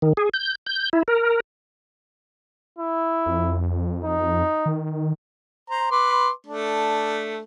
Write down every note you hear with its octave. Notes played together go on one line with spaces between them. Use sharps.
D#3
G#4
G6
G6
E4
A#4
E4
F2
D#4
D#3
C5 A#5
B4 C6 D6
A3 D4